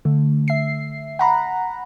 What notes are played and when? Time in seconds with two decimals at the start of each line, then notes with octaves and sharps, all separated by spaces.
0.05 D3 A3
0.48 E5 C7
1.19 F#5 A#5 B5